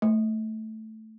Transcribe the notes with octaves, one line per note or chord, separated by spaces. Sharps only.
A3